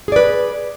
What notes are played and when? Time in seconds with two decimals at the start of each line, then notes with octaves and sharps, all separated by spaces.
0.08 G#4
0.12 D5
0.16 B4